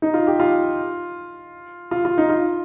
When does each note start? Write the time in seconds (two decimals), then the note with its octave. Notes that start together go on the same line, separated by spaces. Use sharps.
0.02 D#4
0.14 F4
0.27 G4
0.40 F4
1.91 F4
2.05 F4
2.18 D#4
2.29 F4